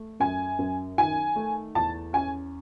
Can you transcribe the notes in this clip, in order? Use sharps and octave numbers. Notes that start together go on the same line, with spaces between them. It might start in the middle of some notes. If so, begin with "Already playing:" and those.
Already playing: A3
F#2 G#5
F#2
D#3 G#5
A3
E2 A5
C#4 G#5